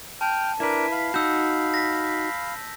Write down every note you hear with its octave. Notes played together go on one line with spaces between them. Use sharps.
G5 A5 F6
D4 E4 A#4 B4
F5 B5
D#4 F#4 E6 G6
A#6 B6